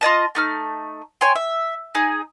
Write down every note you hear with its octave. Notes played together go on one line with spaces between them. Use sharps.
F4 D5 D#5 A5
A3 D#4 F6
C#5 G5 G#5 C6
E5
D#4 G#4